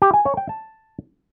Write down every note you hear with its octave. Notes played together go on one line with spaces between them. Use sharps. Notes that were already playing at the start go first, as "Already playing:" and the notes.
G4
G#5
C#5
G5
A5